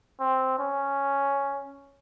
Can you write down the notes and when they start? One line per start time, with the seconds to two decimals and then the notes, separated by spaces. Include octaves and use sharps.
0.20 C4
0.59 C#4